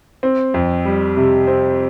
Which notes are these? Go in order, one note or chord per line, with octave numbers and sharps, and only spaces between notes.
C4
F2
G3
C3
C4